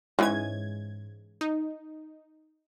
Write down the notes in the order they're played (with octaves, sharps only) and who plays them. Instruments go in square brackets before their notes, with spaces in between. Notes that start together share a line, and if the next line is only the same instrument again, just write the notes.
[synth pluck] G#2 G#6 [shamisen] E3 G#3 C#4
[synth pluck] D#4